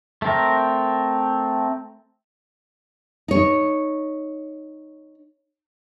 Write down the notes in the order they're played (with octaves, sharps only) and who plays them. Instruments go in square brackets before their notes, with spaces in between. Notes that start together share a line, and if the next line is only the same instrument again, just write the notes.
[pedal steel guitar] A3 C4 A#4
[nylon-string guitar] D#4 C#5